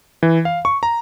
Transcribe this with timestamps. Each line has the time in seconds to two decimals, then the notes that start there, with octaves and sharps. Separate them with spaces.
0.23 E3
0.45 F5
0.65 C#6
0.83 A#5